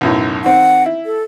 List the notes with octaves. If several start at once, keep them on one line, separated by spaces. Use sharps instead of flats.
B1 F#2 A2
D#3 C4 F#5
E4
A4